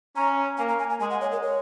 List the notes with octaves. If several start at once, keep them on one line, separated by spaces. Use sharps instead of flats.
C#4 A#5
A#3 G#5
A#5
G#5
G#5
G#3 G#5
F#5
C#5
A#4
C#5